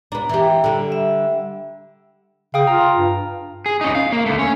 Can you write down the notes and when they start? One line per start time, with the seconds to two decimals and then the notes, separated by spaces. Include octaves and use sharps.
0.12 B3 D4 A#5
0.29 E3 G4
0.64 D3 G3
0.92 E5
2.54 C#3 F5 G5 D#6
2.67 F4 A#5
2.97 G2
3.66 G#4
3.81 C#4 D#4
3.95 F5
4.12 A#3
4.26 D3 A3
4.39 C#4